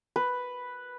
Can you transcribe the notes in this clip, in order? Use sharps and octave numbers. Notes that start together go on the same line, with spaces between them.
B4